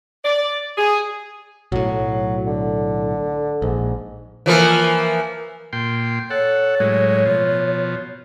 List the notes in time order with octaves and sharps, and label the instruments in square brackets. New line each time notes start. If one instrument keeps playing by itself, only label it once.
[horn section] D5
G#4
[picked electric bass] B1 A2 [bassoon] F#3
[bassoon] D3
[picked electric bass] A#1 [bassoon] G#2
[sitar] E3 F3 A#3
[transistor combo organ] A#2 G5 C6
[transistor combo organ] A4 F#5 [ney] C#5
[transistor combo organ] A2 F#3 G#3
B2 F3